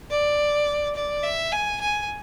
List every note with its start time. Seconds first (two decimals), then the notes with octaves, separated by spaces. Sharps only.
0.10 D5
0.95 D5
1.24 E5
1.52 G#5
1.81 G#5